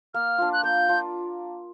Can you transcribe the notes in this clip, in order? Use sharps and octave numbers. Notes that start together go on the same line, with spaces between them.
A#3 F6
D4 F4
F#6
A#3 G6
D4 F4